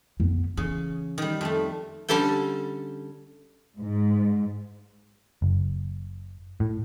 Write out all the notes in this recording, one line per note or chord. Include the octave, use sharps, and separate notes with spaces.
F2 B3
C#3 E3
D#3 G3
F2 G3 A3
D3 G3 C#4 G4 A4 G5
G#2
F#1
A2